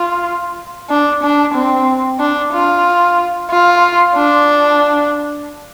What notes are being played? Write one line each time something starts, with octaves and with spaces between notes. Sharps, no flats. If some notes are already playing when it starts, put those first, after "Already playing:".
Already playing: F4
D4
D4
C4
D4
F4
F4
D4